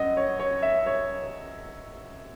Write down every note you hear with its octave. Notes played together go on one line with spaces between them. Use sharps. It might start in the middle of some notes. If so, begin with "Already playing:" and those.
Already playing: F#2 D#5 F#5
C#5
C#5
E5
C#5